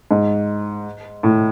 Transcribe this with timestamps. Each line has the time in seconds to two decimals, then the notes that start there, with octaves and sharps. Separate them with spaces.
0.11 G#2
1.23 A2